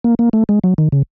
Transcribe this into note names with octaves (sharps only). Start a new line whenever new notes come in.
A#3
A#3
A3
G#3
F#3
D#3
C#3